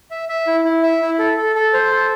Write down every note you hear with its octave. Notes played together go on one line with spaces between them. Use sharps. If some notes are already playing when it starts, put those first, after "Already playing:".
E5
E5
E4
E4
E5
E4
A4
A4
A4
C5
A4